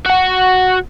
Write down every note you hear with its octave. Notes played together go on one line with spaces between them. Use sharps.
F#4 F#5